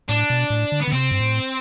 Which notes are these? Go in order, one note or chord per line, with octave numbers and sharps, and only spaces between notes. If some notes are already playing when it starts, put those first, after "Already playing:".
A2 D4
B2
A2
D3
B3
D3
C3 C4
G2
A2